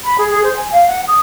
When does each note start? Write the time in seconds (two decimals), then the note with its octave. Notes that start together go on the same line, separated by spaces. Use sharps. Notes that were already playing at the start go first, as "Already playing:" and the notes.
0.04 B5
0.18 G#4
0.30 G#4
0.43 C5
0.56 G#5
0.72 F5
0.86 F#5
1.07 D#6